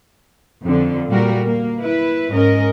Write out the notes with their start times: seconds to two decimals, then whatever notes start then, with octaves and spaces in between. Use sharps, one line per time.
0.64 F2 D3
1.09 A#2 G3 F#4 A#4
1.45 A#3
1.77 E4 B4
2.30 G#2 C#4 A#4 D#5